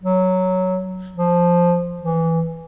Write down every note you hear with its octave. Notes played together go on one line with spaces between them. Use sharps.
F#3
F3
E3